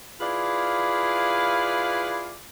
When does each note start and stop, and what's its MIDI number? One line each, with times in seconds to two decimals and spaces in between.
0.20 2.36 64
0.20 2.36 65
0.20 2.36 68
0.20 2.36 71
0.20 2.36 74
0.20 2.36 77